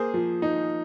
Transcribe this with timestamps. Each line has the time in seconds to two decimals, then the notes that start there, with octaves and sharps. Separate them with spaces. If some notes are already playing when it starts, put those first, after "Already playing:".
Already playing: A#3 G#4 C5
0.14 F3
0.42 D#4